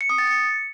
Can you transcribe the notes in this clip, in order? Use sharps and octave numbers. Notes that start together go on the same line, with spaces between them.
C#7
D#6
A6
C#7